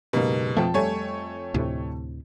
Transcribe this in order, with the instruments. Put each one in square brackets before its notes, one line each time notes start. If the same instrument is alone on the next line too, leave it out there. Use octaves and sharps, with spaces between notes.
[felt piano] F#1 G#2 G4 [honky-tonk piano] B2 A#3
[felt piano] F2 G5 A5 [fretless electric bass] F3 A3
[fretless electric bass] G3 [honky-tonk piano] A3 C#5 G#5
[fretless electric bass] D2 A2 C3